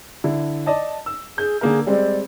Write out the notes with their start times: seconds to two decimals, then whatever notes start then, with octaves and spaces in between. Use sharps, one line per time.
0.24 D3 E4
0.66 D5 D#5 A5
1.06 E6
1.38 G#4 G6
1.61 D3 A#3 G#4 A#4
1.87 G3 G#3 C4 D5